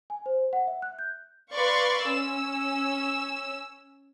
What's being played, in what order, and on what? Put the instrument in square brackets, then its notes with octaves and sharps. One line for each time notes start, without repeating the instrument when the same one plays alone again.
[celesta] G#5
C5
F#5
E5
F#6
G6
[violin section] B4 D5 F5 C6 C#6
C#4 E6